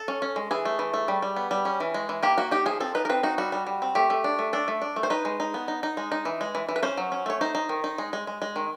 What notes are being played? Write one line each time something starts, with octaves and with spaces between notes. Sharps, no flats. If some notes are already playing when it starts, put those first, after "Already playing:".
Already playing: A4
C#4
C#4
G#3
E3 G#4
A3
E3
A3
G3
G3
B3
G3
C#4
E3
G#3
E3
A#3 G4
A#3 F#4
D#4 G4
F3 G#4
C4 A4
D#4 B4
A#4
C4 B4
D#4 F#4
G3 F#4
G3
G3
C4
A3 G4
A3
D4
A3
D4 A4
A3
D4
A3
C5
D#4 B4
G#3
D#4
B3
D#4
D#4
G#3
D#4
E3
G#3
E3
E3
B4
C#4 C5
F#3
C#4
A3 C#5
D#4 C5
D#4
D#3
D#4
G#3
G#3
G#3
G#3
D#3